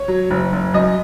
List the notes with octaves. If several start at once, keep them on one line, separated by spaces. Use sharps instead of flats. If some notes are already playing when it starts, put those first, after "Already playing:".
Already playing: C#5
F#3
F#1
F#1
F#2 D#5